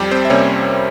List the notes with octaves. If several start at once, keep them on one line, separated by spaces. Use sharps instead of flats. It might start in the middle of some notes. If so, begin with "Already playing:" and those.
Already playing: F2 G3 G4
C4 C5
E5
C3 G3 A#3 C#4 C#5